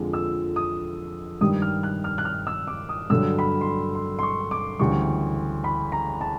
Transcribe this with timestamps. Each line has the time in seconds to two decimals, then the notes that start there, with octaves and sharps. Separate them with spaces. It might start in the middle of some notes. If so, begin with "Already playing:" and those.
Already playing: F2 D3 F3 G#3
0.13 E6
0.56 D#6
1.41 G2 D#3 G3 D#6
1.62 F6
1.83 F#6
2.04 F6
2.18 F#6
2.25 F6
2.47 E6
2.67 D6
2.89 D#6
3.10 G2 D3 F#3 E6
3.39 B5
3.61 C6
3.67 B5
3.95 C6
4.19 C6
4.23 C#6
4.51 D6
4.79 D2 C#3 E3 G3 C#6
5.64 B5
5.92 A#5
6.21 A5